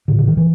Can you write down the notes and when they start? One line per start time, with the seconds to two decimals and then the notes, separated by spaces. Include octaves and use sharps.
0.08 A2 D3
0.19 D3
0.27 D#3
0.37 E3